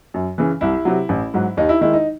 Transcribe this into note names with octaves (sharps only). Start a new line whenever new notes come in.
F#2
C#3 E3
C2 E4
C3 F#3
A1
G#2 F#3
D#2 D#4
E4
D#3 G#3 E4
D#4